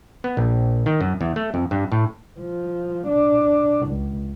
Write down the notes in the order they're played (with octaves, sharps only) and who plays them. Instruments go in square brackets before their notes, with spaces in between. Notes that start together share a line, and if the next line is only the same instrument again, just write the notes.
[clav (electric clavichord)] B3
A#1
D#3
F#2
E2
A3
F2
G2
A2
[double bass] F3
D4
C#2